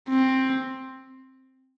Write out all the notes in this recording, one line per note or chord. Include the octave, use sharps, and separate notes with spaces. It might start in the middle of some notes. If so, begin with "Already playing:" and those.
C4